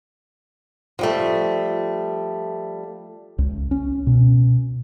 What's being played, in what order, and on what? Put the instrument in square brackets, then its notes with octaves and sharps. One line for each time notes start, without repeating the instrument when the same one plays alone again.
[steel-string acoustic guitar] F3 G3 A3
[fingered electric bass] C#2
C#4
B2